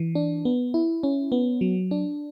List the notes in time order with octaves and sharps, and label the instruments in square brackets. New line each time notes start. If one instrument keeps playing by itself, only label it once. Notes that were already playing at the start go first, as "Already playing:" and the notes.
Already playing: [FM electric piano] E3
D4
B3
E4
C#4
B3
F#3
D4